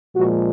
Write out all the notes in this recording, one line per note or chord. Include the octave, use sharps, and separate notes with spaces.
A#2 F3 G#3 F#4